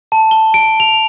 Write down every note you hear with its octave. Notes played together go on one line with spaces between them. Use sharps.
A5
G7
D7
F7